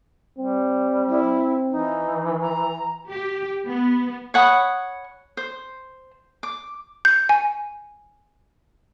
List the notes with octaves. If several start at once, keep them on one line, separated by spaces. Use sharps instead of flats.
G3 C4
E4
E3 D#4
A#5
G4
B3
C#5 F#5 B5 D#6
C5
D6
G6
G#5